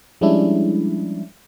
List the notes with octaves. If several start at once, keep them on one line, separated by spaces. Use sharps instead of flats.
F3 G3 G#3 C#4 D4 E4